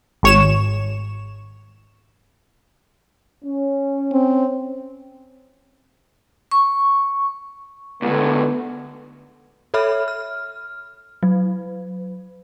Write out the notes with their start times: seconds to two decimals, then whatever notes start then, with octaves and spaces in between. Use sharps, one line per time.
0.23 G#1 C#5 E7
3.45 C#4
4.12 C4
6.51 C#6
8.02 C#2 A2 D3 B3
9.74 A4 C#5 E5 B5 F6
10.08 F6
11.23 F#3